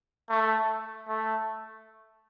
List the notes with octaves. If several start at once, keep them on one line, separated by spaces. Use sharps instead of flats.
A3
A3